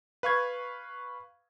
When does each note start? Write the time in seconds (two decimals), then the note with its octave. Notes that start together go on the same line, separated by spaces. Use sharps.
0.23 B4 F5 C#6 G#6